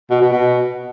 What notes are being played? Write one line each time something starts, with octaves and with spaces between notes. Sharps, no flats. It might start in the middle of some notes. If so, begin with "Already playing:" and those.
B2
B2
B2